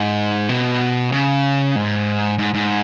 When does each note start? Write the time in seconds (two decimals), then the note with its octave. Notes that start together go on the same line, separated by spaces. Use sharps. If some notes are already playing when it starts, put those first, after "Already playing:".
Already playing: G#2
0.49 B2
1.12 C#3
1.76 G#2
2.38 G#2
2.54 G#2